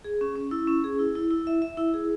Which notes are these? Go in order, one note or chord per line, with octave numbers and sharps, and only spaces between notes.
G#4
C#4
C#4
E4
C#4
G#4
E4
E4
E4
E5
E5
E4
G#4